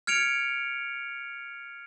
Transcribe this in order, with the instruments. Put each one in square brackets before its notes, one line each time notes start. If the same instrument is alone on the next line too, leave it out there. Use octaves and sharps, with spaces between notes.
[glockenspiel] F6 G#6 C#7 D7 F7